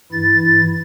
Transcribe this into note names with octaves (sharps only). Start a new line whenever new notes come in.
G2 E3 E4 A6